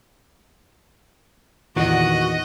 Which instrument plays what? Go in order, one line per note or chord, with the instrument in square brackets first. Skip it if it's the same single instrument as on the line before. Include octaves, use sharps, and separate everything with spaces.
[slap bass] E2 A#2 [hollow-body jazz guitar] D#3 [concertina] F#4 [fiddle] D#5 F#5